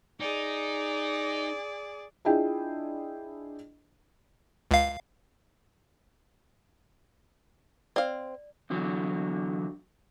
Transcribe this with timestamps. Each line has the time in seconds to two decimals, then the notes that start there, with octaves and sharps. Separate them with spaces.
0.20 D#4 G#4 D5
2.25 D4 E4 F4 G#4 D#5 G5
4.71 C#2 F5
7.96 C4 D5 F5
8.70 E2 D3 F#3